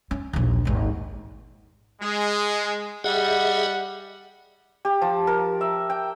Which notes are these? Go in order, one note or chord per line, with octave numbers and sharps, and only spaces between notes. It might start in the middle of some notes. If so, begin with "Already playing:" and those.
C#4
A#1 D#2
G#1 D#2
G#3
G3 G#4 D#5 E5 F#5
G4
F3
A#4
E5
G5